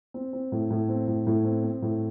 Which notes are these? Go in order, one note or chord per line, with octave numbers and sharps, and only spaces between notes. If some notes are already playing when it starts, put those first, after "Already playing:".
C4
C4
A2
A2
C4
A2
A2
C4
C4
A2